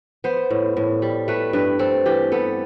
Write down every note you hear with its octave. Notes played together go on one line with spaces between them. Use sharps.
B3 C5
A2
A2
G3
A3 B4
G2 B4
C4 A4
E3 G4
B3 A4